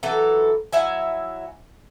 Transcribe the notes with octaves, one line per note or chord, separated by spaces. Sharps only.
E3 F#3 A4
F#3 E4 E5 G#5